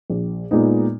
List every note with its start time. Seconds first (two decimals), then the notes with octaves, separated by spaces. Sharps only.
0.10 A#1
0.51 A#2 G#3 B3 D#4